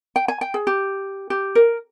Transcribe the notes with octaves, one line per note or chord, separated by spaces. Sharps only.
G5
G#5
G5
G#4
G4
G4
A#4